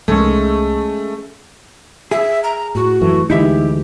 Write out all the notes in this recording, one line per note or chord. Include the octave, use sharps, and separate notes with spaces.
C2 G#3 A3 C#4 E6
G#4 E5
A#5
A2 F#4
F#2 E3 A3
D2 E3 G#3 D#4 E4 G4 E5